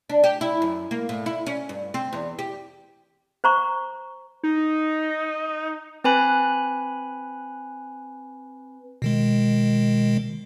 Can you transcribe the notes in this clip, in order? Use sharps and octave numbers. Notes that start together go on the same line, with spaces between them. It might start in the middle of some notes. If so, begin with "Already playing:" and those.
D4
G4
E4
F#2
A#3
A2
E4
C#4
G2
C4
E2
G4
C5 A#5 C#6
D#4
C4 B4 G#5 B5 F#6
B2 D#3 G#3